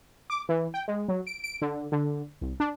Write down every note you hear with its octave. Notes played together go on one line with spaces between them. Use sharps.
D6
E3
G5
G#3
F#3
D7
D7
D3
D3
C2
D4